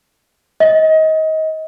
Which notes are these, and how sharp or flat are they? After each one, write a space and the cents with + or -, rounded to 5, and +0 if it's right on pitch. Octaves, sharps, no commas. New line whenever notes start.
D#5 +25